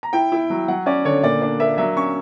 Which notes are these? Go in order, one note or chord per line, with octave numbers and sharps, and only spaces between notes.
A#5
E4 G5
E4
F#3
F#3 F#5
C#4 D5
D3 C#5
A#2 D5
D4 D5
A#3 E5
F#3 E5
C#4 C#6